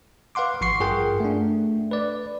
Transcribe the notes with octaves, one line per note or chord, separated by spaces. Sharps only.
B4 F5 F#5 C6 D6
G#1 F3 C6 C#6 C7
G2 F4 G#4 A#4 F#5 G5
A3 D4
B4 D5